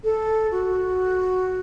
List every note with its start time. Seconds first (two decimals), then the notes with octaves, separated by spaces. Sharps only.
0.04 A4
0.51 F#4